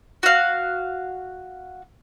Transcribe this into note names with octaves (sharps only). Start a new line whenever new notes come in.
F#4 F5